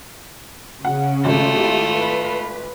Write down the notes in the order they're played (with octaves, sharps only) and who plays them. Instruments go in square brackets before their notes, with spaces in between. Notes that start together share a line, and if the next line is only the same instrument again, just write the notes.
[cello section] C#3 C#4 [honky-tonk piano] F#5
[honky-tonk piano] G#1 [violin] A3 F4
[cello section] E4 G4
B4